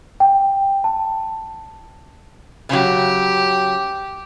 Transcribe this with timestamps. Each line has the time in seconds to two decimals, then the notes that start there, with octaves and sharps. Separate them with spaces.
0.20 G5
0.84 A5
2.69 C#3 F#3 G4